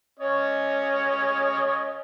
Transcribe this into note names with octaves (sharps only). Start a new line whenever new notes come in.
C#4 C#5 D#5